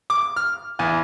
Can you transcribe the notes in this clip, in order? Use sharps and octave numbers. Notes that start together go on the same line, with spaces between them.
D6
F6
E2